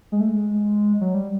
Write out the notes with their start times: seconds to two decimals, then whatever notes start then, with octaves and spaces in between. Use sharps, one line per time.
0.12 G#3
0.21 A3
0.28 G#3
1.01 F#3
1.14 G3